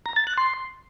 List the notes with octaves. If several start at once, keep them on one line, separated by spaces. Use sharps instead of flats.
A#5
A6
F#6
C6